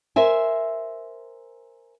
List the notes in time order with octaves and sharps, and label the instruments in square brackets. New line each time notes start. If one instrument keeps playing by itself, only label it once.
[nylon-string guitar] A#4 C5 E5 G#5